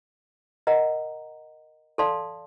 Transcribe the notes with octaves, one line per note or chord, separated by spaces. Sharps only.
A#4 D#5 F#5 A#5
A4 D5 F5 A5 C6